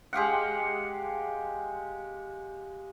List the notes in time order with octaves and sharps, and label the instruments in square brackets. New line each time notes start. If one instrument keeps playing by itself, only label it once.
[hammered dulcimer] G#3 G4 F5 F#5